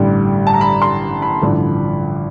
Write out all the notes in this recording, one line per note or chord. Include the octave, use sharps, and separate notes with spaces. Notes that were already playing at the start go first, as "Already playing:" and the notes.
Already playing: A1 G2 D3 G3
A5
A#5
B5
C6
B5
A1 G2 D3 F3